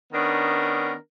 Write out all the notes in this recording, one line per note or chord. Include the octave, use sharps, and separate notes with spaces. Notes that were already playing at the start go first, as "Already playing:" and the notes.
D#3 B3 C#4 D4 A#4